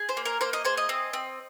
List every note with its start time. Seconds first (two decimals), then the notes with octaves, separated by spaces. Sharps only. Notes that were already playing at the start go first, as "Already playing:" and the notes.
Already playing: G#4
0.09 C5
0.17 A#3
0.25 A#4
0.41 A#3 C5
0.53 D#5
0.65 G#4 C5
0.77 D#5
0.89 C4
1.13 C4